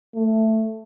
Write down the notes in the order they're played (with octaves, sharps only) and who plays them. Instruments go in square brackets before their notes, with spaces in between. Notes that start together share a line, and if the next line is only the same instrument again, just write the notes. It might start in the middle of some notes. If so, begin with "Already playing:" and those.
[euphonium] A3